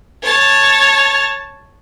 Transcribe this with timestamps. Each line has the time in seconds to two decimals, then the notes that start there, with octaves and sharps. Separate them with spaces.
0.23 C#5 A5